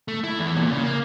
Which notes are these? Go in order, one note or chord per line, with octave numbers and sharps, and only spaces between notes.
A3
E4
E2
A#2
C#3
A#3